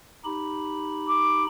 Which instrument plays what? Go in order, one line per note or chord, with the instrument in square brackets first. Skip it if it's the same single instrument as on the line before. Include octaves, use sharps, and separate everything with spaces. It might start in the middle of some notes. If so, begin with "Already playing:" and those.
[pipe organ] D#4 G4 B5
[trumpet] D6